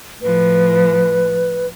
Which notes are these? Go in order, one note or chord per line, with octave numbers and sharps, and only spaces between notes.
A2 F3 B4